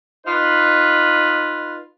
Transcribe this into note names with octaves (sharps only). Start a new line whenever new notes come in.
D#4 F4 B4